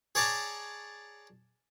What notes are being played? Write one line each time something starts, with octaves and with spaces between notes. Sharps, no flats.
G#4 C#5 D5 A5 A#5